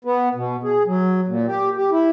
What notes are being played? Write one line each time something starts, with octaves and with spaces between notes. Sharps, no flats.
B3
B2
G#4
F#3
A#2
G4
G4
E4